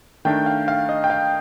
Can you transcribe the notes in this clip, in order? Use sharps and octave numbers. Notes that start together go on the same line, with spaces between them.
D#3 A3 D4 G5
F5
F5
D#5
G5
F5